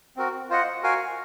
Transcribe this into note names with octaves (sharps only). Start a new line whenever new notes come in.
C4 F#4 A#4
F4 C5 D#5 F#5
F#4 A#4 F5 G#5